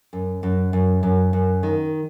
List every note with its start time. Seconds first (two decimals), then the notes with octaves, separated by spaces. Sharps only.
0.13 F#2
0.43 F#2
0.73 F#2
1.03 F#2
1.33 F#2
1.63 D#3